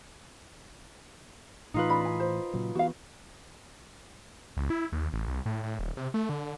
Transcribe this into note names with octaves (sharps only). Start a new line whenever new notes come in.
A2 E3 D#4 F4 B4
C#4 D5 B5
G#5
C5
A#2 C#3 F#3
E3 B3 F#4 F5
C#2
E4
D#2
A1
C2
A2
A2
D#1
C3
A3
D3